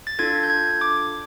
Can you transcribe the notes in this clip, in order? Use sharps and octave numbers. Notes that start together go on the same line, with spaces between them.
A6
D4 F4 A4 G#6
G6
G#6
D6